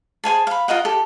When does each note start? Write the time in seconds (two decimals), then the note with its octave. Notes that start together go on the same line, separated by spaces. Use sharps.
0.24 G#4 C5 G#5 A5
0.47 F5 B5
0.68 F4 A#4 D#5 F#5
0.85 G4 A4